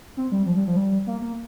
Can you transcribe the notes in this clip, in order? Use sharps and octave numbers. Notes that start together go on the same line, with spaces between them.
C4
G3
F3
G3
F3
G3
A#3
A#3